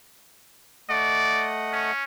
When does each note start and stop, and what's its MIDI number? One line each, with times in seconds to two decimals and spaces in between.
0.89 1.92 57
0.89 1.50 74
0.89 1.92 75
0.89 1.92 78
1.72 2.04 61